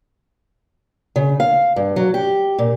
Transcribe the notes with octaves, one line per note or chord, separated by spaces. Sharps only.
C#3
F5
G2
F#3
G4
A#2